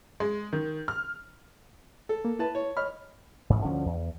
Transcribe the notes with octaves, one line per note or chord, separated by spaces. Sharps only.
G#3
D#3
F6
A4
A#3
E4 B4 A5
C#5
C#5 D#5 B5 F6
A1 G#2
D2 D3 F3 C#4
E2